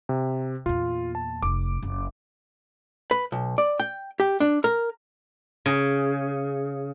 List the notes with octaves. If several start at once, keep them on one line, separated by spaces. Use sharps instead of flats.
C3
E2 A#2 F4
A5
F1 D6
F#1
B4
B1
D5
G5
G4
D4
A#4
C#3